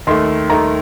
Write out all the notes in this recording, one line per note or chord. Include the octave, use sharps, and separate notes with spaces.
D#2 D#3 A3 C6
D#2 D#3 A3 A#5